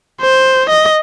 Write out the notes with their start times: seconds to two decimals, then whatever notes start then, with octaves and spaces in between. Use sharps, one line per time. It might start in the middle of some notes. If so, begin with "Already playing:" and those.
0.21 C5
0.70 D#5